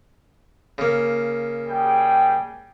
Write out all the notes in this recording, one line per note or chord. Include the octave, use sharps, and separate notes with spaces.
C#3 A#3
G3 G#4 G5